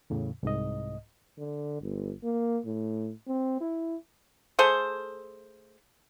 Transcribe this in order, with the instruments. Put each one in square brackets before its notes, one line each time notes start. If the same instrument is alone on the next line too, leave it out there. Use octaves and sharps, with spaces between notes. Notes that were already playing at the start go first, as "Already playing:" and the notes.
[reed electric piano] E2 A2 C#3
C2 G#2 D#5
[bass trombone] D3
G1
A#3
A2
C4
E4
[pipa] A3 G#4 A4 C5